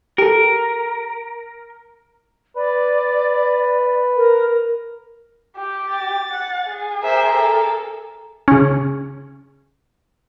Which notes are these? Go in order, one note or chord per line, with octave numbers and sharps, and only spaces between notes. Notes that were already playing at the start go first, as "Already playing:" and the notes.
G4 A4 A#4
B4 D5
A#4
G4
A6
F#5
G#4
A#4 C5 E5
A4
C#3 C#4